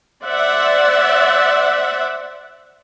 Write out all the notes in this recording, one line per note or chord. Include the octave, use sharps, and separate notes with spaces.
C5 D5 E5 F#5